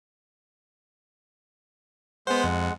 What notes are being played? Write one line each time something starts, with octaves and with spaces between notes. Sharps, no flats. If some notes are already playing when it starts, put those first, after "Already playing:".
G#3 B3 C5 F#5
F2